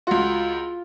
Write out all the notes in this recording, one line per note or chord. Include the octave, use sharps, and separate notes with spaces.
C#2 F4 F#4